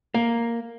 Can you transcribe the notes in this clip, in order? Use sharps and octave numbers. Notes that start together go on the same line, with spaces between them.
A#3